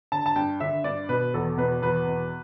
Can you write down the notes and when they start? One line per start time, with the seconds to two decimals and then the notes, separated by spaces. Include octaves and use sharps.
0.12 D3 A5
0.26 A5
0.36 G2 G5
0.60 D3 E5
0.84 G2 D5
1.09 B2 B4
1.34 E2 A4
1.58 B2 B4
1.82 E2 B4
2.07 B2